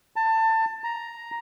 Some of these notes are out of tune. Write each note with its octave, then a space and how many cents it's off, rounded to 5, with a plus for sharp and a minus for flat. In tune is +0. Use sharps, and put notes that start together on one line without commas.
A5 +25
A#5 +5